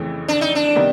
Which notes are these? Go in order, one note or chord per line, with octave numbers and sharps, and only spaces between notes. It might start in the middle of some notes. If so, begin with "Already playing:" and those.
Already playing: F2 C#3 E3 A3
D4
D#4
D4
C3 D#3 G3 B3 D#4